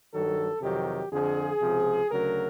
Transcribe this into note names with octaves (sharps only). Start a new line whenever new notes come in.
G2 D#3 F#3 A4
F2 C3 D#3 F#3 G4
F2 D3 F3 G#4
C#2 C3 F3
D2 C#3 F#3 A#4